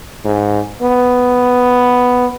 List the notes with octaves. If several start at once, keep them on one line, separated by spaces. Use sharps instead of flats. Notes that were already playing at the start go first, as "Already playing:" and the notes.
G#2
B3